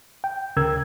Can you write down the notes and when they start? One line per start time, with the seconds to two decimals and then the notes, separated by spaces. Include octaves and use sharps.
0.24 G5
0.57 D2 C#3 A#4 E6 G#6